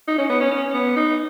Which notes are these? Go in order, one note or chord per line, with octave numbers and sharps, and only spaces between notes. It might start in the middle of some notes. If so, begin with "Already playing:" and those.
D#4
C#4
B3
C#4
C#4
B3
D#4